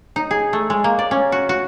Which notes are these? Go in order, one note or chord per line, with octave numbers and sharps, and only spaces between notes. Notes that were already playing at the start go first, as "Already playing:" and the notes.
D#4
G#4
A3
G#3
A#3
D5
C#4
F#4
F#4